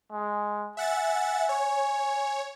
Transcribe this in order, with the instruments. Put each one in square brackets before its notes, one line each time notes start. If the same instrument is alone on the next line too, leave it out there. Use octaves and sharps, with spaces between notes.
[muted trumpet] G#3
[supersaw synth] E5 F#5 A6 [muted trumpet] G#5
[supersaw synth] C#5